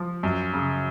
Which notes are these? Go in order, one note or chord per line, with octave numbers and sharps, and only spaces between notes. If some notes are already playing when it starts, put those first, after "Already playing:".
Already playing: F3
F#2
C#3